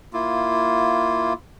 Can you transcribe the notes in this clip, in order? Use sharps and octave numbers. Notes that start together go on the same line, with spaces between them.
A#3 E4 F4